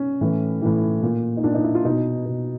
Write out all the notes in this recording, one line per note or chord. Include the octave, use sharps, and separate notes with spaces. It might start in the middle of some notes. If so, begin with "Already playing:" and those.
Already playing: C#4
A2 E3
A2 E3
A#2
D#4
A#2 D4
D#4
E4
F4
B2 D#4
B2